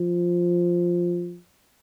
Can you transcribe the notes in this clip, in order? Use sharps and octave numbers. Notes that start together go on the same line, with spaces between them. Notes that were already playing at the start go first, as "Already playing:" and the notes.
Already playing: F3